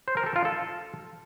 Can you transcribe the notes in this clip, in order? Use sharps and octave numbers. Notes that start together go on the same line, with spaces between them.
C5
A#4
A4
F4
A4